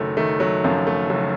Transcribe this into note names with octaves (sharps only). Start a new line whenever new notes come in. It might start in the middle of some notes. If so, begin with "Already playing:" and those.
Already playing: F#1 D#3 F#3 A3
D#3 A3
F#3
F#2 F3
A3
F#1 F#3